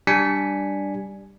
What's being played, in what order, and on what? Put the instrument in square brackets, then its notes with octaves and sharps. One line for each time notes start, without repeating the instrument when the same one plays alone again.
[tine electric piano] G3 D4 G#5 B6 C#7